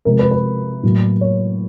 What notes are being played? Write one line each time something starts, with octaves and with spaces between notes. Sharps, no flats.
C3 F3 G#3 A#4
B4
B4
A2 F#3 A#3
C#5